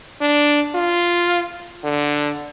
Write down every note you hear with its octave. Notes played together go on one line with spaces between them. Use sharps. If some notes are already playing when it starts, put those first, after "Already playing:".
D4
F4
D3